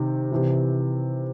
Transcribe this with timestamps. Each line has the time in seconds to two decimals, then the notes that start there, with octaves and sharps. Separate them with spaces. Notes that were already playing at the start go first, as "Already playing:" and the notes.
Already playing: C3 D#3
0.32 C3 E3